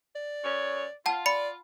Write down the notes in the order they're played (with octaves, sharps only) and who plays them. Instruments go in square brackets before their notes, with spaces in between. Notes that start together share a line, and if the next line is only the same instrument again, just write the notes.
[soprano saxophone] D5
[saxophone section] F#2 C#5
[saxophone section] F4 [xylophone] F#5 A5
[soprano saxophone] D5 [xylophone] B5 C#7